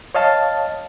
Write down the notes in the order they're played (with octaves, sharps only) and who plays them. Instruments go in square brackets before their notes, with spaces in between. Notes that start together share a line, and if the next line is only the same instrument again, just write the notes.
[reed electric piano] C#5 D#5 F5 A5